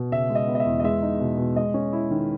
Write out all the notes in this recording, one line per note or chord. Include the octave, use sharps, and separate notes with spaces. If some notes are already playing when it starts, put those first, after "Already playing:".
Already playing: B2
C#3 E5
G#3
D#5
B3
D#5
E5
E2
D#5
G#3 E5
D#4
B2
B2
G#3 D#5
C#4
E4
D#3